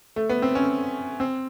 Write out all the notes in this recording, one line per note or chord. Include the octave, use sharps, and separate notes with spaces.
A3
B3
C4
C#4
C4